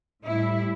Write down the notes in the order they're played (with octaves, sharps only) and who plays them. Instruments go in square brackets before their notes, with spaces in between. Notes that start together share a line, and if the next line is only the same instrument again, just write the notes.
[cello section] A2 G3 E4